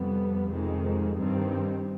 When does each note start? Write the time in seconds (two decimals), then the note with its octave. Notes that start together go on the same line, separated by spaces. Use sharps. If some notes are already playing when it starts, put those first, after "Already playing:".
Already playing: F2 C3 G3 B3
0.50 F2 C3 D#3 G#3 C4
1.16 G2 D#3 G3 C4